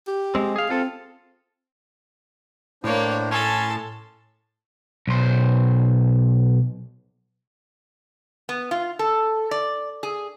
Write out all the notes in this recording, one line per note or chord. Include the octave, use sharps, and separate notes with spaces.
G4
G#3 C4
G#4 F5
C4 F4 A4
A2 A#3 D4 C5 C#5
C#4 A4 A5 C6
B1 C5
B3
F4
A4
D5
G#4